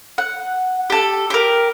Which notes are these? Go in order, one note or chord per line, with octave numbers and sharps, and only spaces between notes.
F#5
G4 A4
G4 A#4